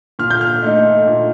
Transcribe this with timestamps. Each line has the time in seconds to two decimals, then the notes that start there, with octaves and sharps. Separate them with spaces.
0.19 A#2 F6
0.31 G6
0.41 F6
0.62 A3 D#4
1.07 A#2